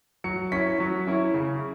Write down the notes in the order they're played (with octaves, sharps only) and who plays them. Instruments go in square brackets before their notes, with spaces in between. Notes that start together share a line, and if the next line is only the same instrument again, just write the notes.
[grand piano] F#3 C#7
C#4 E4 B6
F#3
C#4 E4
C#3